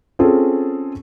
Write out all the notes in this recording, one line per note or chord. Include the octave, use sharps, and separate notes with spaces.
C4 C#4 F4 G#4 A4